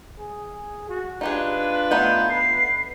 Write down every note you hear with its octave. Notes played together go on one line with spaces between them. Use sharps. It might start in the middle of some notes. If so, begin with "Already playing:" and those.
G#4
F#4
D4 D#4 F4 G4 G#4 B4
A3 B3 D#4 G6
B4 C7